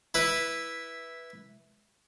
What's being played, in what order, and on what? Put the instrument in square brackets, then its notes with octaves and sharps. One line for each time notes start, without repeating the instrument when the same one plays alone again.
[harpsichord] E4 B4